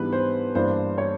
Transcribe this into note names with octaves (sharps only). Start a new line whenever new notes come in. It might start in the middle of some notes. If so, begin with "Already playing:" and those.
Already playing: G#2 E3 G3 B3 D4 B4
C5
G2 E3 G3 A#3 D4 C5
C#5